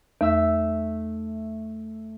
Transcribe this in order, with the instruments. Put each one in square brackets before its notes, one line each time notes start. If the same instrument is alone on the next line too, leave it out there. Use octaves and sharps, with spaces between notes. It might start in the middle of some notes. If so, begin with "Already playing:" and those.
[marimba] E2 [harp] A3 E5 E6